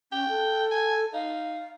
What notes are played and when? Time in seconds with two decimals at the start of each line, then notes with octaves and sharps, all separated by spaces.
0.12 C#4 G5
0.28 A4
0.71 G#5
1.13 D#4 F5